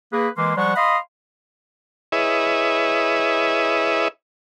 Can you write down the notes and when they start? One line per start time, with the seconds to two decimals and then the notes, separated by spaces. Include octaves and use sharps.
0.13 A#3 G#4 B4
0.37 E3 G#3 A#3 C6 D6
0.57 F3 G3 G#3 F#5 C#6
0.76 D#5 F5 B5 C6 D#6
2.12 E4 G#4 B4 C#5 D#5 E5